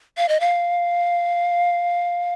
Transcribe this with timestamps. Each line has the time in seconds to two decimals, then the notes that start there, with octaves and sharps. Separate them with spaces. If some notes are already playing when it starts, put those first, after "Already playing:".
0.17 F5
0.29 D#5
0.40 F5